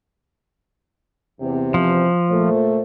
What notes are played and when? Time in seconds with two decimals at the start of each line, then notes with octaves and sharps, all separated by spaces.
1.40 E2 C3 C4
1.74 F3
2.30 A#2 A3 C5